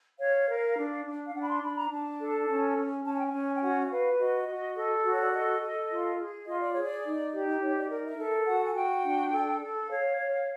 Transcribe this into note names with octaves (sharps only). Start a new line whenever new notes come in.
C#5 F5
A#4
D4
D4
F5
D4 F#5
B5
C6
D4 B5
A#5
D4 A5
A4
C#4
C#4
C#4 A5
G#5
G5
G#5
C#4
G5
F#4 F#5
E5
B4 F5
F#4 D#5
F#4
A4
F#4
C#5
D5
A4 D#5
A4
F4
G#4
F4 D#5
D5
G#4 C#5
D5
D#4
G4
D#4 C#5
D5
A#4 D5
E5
A4 E5
F#4 F#5
G#5
F#4 G5
D4
A4
A4
C#5 F5
C#5